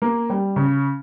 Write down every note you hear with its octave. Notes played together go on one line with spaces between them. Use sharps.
A#3
G3
C#3